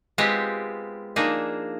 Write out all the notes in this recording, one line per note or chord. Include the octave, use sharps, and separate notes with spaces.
G#3 B3 C4 F4 G4
F3 A#3 D4 D#4 G#4